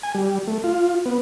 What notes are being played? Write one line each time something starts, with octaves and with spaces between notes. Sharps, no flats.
G#5
G3
A3
F4
B3